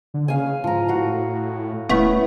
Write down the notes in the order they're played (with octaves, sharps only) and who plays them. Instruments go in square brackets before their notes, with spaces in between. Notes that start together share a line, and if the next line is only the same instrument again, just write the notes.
[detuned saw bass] D3
[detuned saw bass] C#3 [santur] F5 G#5
[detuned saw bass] G#2 [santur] F3 A#5
[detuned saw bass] A2 [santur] F#4 F5
[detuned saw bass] D#1 [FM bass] A3 [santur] B3 C#4 E4